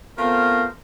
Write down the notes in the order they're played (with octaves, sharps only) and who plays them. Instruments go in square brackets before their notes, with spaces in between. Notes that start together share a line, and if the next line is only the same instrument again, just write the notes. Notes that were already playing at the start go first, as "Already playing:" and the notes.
[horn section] A3 B3 C4 F4 A#4 C5